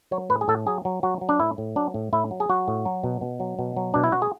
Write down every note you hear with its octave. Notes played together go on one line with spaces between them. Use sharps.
F#3 C#5
A2 B4
G#4
A2 A4
F#3 G#4
F#3
F#3 F#4
F#3
D4
A2 E4
A2
F#3 D4
A2
A2 E4
F#3
G#4
F#3 F#4
A2
F#3
B2
B2
F#3
B2
F#3
B2 D4
E4
B2 F#4
G#4